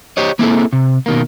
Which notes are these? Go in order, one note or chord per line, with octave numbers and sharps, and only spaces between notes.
G4 C5 C#5 D#5
A#3 C4 E4 G#4 A4
C3
B2 D#3 A#3